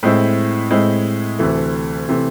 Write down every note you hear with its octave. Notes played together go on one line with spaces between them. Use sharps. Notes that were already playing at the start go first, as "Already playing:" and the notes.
A2 G#3 C4 E4
A2 G#3 C4 E4
D2 C3 E3 A3
C3 E3 A3